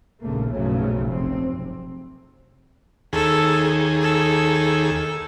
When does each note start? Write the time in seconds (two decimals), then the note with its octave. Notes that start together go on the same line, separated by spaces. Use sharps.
0.23 A#1 D#2 C#3 A3 A#3
0.52 B1 G2 C#3 F3 F#3 A3
1.09 F1 C3 C4
3.13 D#2 G#4 A4
4.01 A4